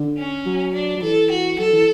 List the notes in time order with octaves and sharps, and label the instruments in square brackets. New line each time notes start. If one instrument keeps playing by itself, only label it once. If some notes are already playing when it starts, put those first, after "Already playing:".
Already playing: [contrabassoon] D3
[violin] C#4
[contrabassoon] F#3
[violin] D4
[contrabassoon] F#3
[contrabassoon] E3 [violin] A4
[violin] F#4
[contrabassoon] F#3 [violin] A4
[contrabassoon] E3